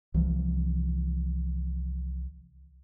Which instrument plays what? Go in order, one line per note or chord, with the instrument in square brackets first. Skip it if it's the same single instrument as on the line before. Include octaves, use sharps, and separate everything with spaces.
[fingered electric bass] C2 E3 F3